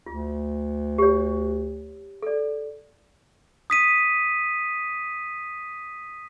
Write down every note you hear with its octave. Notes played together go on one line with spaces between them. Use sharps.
D2 F4
G4 C#5
A4 D5
D#6 B6 D#7